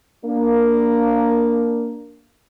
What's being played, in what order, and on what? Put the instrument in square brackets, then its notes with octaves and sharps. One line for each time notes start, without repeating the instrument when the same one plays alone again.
[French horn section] A#3 D4